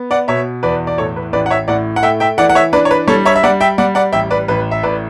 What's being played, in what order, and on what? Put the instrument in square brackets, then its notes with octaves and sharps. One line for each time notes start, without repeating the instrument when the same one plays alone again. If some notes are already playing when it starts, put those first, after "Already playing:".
Already playing: [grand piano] B3
D5 F#5
B2 C#5 E5
E2 B4 D5
D5
A2 A4 C#5
B4
A1 B4 D5
F#5
C#5 E5
A2 D5 F#5
F#5
A3 E5 G5
E5 G5
E3 D5 F#5
F#5
C#5 E5
D4 B4 D5
C#5
B4
G3 A4 C#5
C#5 E5
E5
G3 D5 F#5
E5 G5
G3 D5 F#5
D5 F#5
A1 E5 G5
B4 D5
A1 B4
E5
A2 B4 D5